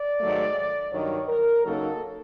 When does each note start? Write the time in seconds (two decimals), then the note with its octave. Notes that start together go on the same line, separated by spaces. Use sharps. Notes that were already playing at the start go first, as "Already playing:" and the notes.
Already playing: D5
0.20 G#2 D#3 F#3 A3
0.93 G2 D#3 F#3 C#5
1.28 A#4
1.64 C#3 F#3 A#3 D#4 A4